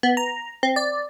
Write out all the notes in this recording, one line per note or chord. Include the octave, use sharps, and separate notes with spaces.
B3
A#5
C4
D5